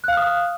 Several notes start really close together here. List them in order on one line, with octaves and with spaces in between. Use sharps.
F#6 F5 F6 D#6